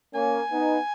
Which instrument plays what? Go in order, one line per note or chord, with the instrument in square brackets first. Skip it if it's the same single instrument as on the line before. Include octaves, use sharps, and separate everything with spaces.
[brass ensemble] A#3 C#4 [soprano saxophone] G#5
[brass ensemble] B3 D#4